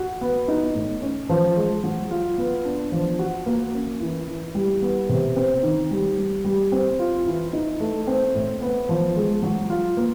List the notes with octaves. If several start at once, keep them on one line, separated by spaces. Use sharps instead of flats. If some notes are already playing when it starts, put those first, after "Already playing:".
Already playing: F#4
B3
D#4
A2
C#4
F3
G#3
F#3
F4
B3
D4
F3
F#4
A#3
C#4
E3
E3
G3
B3
C3
C4
D#3
G3
G3
G3
C4
F4
E3
D#4
A3
C4
A2
B3
F3
G#3
F#3
F4
A#3